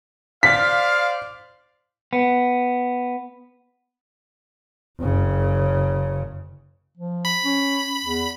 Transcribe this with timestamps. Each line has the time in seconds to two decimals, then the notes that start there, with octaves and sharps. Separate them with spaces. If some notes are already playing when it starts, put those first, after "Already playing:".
0.43 C5 D5 F5 B6
2.13 B3
5.00 F#1 C#3
6.97 F3
7.25 B5
7.45 C#4
8.04 E2